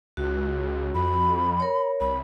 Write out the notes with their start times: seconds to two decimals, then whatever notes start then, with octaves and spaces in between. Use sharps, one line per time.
0.17 C#2 F#4
0.95 F2 B5
1.60 A#4 C#5
2.00 C2 B5